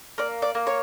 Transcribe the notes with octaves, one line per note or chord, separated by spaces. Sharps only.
A#3 D5
D5
A#3
C#5